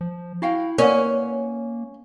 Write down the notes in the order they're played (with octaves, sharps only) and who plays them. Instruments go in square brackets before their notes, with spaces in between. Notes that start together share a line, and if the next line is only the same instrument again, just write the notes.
[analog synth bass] F3
[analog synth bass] E4 [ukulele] F#4 F5 G5
[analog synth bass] A#3 [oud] C#4 [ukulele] E4 B4 F#5 [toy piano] A#4 D5